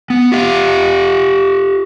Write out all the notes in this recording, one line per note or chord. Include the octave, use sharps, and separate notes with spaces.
B3
F4 G4 F5